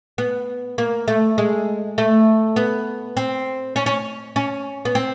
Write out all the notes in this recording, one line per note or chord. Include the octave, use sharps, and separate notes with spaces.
B3
A#3
A3
G#3
A3
B3
C4
C#4
C#4
C#4
B3
C4